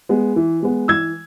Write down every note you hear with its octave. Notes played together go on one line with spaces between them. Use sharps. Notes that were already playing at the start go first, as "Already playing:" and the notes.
G#3 B3
E3
G#3 B3
E3 E6 G#6